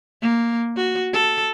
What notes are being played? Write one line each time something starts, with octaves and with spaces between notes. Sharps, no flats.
A#3
F#4
A4